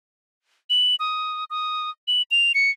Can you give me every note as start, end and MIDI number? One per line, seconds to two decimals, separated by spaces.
0.70 0.95 102
1.00 1.44 87
1.50 1.90 87
2.08 2.22 102
2.31 2.53 101
2.54 2.71 97